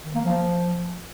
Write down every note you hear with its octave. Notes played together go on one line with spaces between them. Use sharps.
D#3
A#3
F3